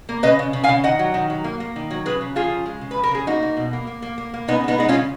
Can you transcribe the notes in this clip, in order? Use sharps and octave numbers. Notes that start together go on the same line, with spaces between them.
A#3
C#3 B4 D#5
C#3
C#3
F5 G#5
C#3
D#3 D#5 F#5
F#3
D#3
F#3
A#3
A#3
D#3
F#3
C#3 G#4 B4
C#3
F3 F4 G#4
C#3
G#3
C#3
B4
F3
A#4
C#3 G#4
A#3 D#4 F#4
A#3
B2
A#3
A#3
A#3
A#3
A#3
C#3 B3 D#4
G#3 B3 D#4
G#3 D#4
C#4 F4
C#3